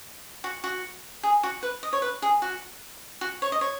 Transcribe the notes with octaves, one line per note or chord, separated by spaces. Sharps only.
F#4
F#4
G#4
F#4
B4
D#5
C#5
B4
G#4
F#4
F#4
C#5
D#5
C#5